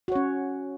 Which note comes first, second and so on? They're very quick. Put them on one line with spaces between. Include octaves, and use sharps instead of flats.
F#4 C#5 C#4